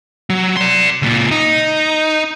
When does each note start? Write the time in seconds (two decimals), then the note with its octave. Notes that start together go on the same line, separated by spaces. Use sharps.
0.30 F#3
0.57 D5 C6
1.02 C#2 A#2
1.31 D#4